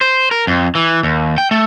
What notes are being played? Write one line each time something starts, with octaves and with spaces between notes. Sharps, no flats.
C5
A#4
F2
E3
D#2
G5
A3